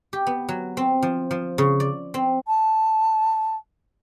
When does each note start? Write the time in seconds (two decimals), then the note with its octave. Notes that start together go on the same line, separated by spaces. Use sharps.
0.13 G4
0.27 B3
0.49 F#3
0.77 C4
1.02 F3
1.31 F3
1.58 C#3
1.80 D5
2.14 C4
2.47 A5